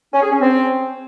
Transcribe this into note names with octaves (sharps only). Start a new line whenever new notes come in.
C#4
G#4
C#4
C4